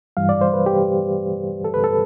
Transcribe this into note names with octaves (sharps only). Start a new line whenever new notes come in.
G2 E3 G3 F5
D5
C5
B4
G4
A4
B4
A4